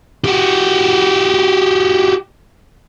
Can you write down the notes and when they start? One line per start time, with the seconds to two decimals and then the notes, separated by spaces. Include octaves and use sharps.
0.24 F#4 G4